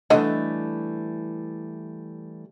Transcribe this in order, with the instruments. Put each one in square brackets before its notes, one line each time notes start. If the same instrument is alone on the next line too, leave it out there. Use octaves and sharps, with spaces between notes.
[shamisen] D3 D4 D#5 [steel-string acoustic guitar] E3 G3 A3